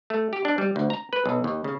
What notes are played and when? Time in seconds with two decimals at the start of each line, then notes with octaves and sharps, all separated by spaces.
0.10 A3
0.33 G4
0.45 D4
0.58 G3
0.76 D2
0.90 A#5
1.13 B4
1.26 B1
1.44 D#2
1.64 C#3